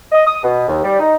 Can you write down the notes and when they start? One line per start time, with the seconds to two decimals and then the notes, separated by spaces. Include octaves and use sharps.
0.12 D#5
0.26 D#6
0.43 B2
0.68 D#2
0.84 G3
1.00 D#4